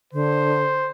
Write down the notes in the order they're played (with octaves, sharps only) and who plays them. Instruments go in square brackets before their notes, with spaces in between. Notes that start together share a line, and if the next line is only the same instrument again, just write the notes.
[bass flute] D3 [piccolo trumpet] C5